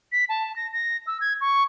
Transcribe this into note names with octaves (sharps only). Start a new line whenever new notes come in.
B6
A5
A#6
A#6
E6
G#6
C#6